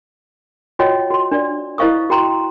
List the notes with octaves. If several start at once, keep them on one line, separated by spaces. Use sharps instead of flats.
F4 F#4 C#5 D#5 F#5 G5
F#4 C6
D4 D5
E4 C5 D#5 F5 C#6 D#6
F#4 G5 A#5 C6